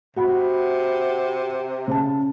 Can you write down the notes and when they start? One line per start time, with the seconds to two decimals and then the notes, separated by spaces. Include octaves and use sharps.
0.16 C3 F#4 F#5 B5
1.88 C#3 A5